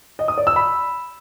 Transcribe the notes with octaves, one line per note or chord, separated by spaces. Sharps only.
D#5
D#6
D5
E6
B5